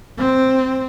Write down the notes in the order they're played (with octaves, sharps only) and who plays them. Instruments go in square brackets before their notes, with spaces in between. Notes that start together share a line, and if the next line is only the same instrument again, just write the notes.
[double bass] C4